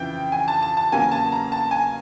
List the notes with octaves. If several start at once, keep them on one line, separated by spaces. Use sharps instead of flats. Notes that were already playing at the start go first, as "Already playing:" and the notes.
Already playing: F2 C#3 E3 G5
G#5
A5
A5
A5
E2 C#3 F#3 A#3 G#5
A5
A#5
A5
G#5